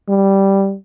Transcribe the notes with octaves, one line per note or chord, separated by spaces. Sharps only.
G3